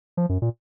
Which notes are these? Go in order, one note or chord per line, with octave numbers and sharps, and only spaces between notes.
F3
F#2
A#2